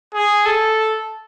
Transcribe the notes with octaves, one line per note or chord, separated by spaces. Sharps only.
G#4
A4